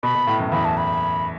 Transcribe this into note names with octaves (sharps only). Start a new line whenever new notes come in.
B2 B5
B2
A2
F#2
E2 B5
A5
B5